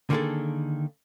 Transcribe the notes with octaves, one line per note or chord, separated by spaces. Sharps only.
D3 D#3 A#3 C4 G#4 A4